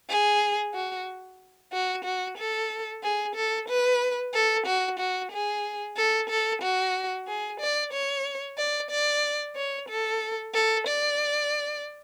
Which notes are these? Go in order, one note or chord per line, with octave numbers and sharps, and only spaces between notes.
G#4
F#4
F#4
F#4
A4
G#4
A4
B4
A4
F#4
F#4
G#4
A4
A4
F#4
G#4
D5
C#5
D5
D5
C#5
A4
A4
D5